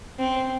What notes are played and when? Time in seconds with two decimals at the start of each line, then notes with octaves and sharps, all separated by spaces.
0.19 C4